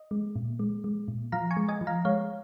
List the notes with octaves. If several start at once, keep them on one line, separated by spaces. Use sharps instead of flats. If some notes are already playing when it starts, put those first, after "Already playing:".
Already playing: D#5
G#3
A#2
G#3
G#3
A#2
F3 F5 A#5
G#5 C#6
G#3
D#5 G#5
F3
F5 A#5
G#3 C#5 F5